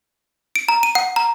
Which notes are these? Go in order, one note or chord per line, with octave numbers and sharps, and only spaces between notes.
D7
A#5
D#7
F#5
A#5